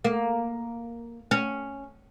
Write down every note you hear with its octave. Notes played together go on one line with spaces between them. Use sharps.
A#3
C#4